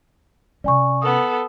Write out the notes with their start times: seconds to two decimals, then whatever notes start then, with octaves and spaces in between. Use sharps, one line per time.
0.64 C3 C#4 D5 G#5 C#6
1.02 B3 A4 D#6